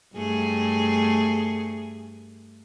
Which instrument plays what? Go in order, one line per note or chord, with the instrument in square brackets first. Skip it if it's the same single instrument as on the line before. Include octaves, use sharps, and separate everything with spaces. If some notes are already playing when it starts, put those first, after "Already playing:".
[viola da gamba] G2 A3 G#4